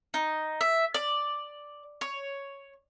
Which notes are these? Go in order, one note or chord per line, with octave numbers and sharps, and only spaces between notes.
D#4
E5
D5
C#5